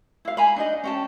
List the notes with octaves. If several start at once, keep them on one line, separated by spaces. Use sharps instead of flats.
E4 F5
G#5 A#5 B5
D4 D#4 D#5
C#4 G5 A5